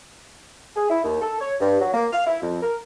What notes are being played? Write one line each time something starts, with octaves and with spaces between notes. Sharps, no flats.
G#4
E4
D#2
A4
C#5
G2
F#3
A#3
F5
E4
F2
A#4